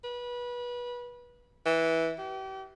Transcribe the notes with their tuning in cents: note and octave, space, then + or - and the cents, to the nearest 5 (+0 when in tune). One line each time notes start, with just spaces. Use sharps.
B4 -25
E3 -10
G4 -35